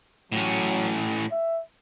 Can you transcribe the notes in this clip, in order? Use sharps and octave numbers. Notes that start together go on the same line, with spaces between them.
A2 F#3 C#4
E5